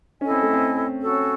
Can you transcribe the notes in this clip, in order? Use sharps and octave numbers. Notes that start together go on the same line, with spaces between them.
C#4 E4 A4 D#5 G#5
C4
A3
C4
C#4 F#4 A4